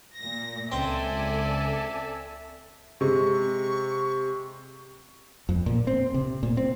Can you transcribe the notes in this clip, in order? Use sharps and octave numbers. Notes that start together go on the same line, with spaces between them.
A#2 A#6
C#2 C4 A4 D5 E5 G#5
C3 G#3 C#6
F2
A#2
C4
C3
A#2
C4